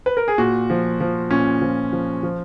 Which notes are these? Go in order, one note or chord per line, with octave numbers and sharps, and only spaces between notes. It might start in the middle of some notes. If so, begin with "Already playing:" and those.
B4
A#4
G#4
A#2 F#4
F3
F3
A#2 C#4
F3
F3
F3